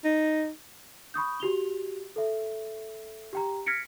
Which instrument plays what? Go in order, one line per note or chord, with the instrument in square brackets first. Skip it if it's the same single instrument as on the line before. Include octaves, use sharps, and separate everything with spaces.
[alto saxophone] D#4
[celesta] B5 C#6 D#6 G6
F#4 G4 F7 G7
A4 E5
G4 G5 A#5
F6 G#6 A#6 B6 C#7 D7